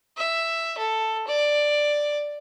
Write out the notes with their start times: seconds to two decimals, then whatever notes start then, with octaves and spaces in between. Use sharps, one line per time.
0.17 E5
0.78 A4
1.27 D5